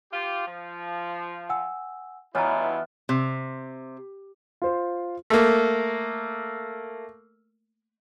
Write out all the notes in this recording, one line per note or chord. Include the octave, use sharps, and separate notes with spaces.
F4 G4
F3
F#5 G#5 E6
G2 B2 E3 B3 E4 F4 C#5 A#5
C3
F4 C5
A3 A#3